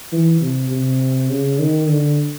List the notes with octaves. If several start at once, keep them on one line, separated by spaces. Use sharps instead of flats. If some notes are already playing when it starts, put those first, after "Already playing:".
E3
C3
C3
C#3
D#3
D3